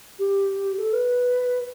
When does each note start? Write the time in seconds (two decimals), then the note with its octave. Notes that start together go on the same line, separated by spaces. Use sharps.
0.19 G4
0.78 A4
0.93 B4